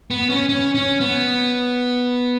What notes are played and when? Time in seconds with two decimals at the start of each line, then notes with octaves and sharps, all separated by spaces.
0.11 B3
0.30 C#4
0.49 C#4
0.75 C#4
1.00 B3